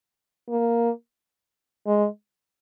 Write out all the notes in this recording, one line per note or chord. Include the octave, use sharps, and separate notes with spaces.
A#3
G#3